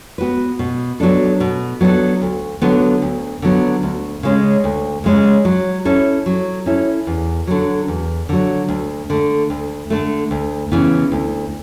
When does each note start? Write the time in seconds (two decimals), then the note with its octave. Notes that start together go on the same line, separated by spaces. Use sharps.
0.18 B3 F#4 B4
0.59 B2
1.00 F#3 B3 D4 A4
1.40 B2
1.81 F#3 B3 D4 A4
2.22 D2
2.62 D3 F#3 B3
3.02 D2
3.42 D3 F#3 B3
3.83 D2
4.23 C#3 G#3 C#4
4.64 D2
5.04 C#3 G#3 C#4
5.45 F#3
5.85 C#4 E4 A4
6.26 F#3
6.66 C#4 E4 A4
7.07 E2
7.47 D3 F#3
7.88 E2
8.29 D3 F#3
8.68 D2
9.10 D3 A3
9.50 D2
9.90 D3 A3
10.31 D2
10.72 C#3 E3 B3
11.12 D2